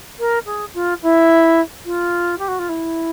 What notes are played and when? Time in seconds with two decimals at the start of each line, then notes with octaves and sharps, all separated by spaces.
0.19 A#4
0.46 G#4
0.74 F4
1.02 E4
1.85 F4
2.38 G4
2.48 F#4
2.59 F4
2.69 E4